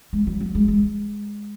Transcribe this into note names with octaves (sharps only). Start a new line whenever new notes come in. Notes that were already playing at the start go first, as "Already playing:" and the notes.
G#3
F#3
F#3
G#3
G#3